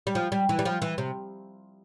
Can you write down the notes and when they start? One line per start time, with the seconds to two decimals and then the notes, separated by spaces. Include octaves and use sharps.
0.07 G3
0.15 F3
0.32 G3
0.49 E3
0.59 G3
0.65 F3
0.82 E3
0.98 C3